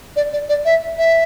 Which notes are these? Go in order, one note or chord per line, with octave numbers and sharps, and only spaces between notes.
D5
D5
D5
E5
E5